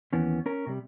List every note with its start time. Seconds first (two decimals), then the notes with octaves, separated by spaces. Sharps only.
0.13 D#2 E3 B3 C#4
0.46 C#4 A#4
0.67 C3 G3